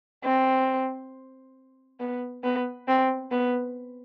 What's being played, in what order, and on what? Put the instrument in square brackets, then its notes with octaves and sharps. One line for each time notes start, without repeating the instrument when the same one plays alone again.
[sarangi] C4
B3
B3
C4
B3